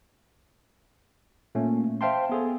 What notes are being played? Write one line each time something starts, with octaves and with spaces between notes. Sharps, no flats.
A#2 A3 A#3 C#4
C5 E5 F5 G5 A5 C6
B3 G#4 A4